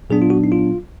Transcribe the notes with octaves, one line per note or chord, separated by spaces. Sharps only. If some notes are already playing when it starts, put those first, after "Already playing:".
A#2 F#3 B3 D4 G#4
F4
F#4
D#4
F4